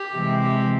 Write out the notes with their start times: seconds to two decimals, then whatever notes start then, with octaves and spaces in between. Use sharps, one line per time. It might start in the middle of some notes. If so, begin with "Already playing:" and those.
Already playing: G4
0.14 C3 E3 G#3 C4
0.42 G4